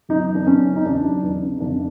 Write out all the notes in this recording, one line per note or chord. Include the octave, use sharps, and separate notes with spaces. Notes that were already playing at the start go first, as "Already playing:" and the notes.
F#2 D#4
E3
D4
F#2 C#4
C#3
D#4
E2 D4
F#3
E2 D#4
C#3
F2 D4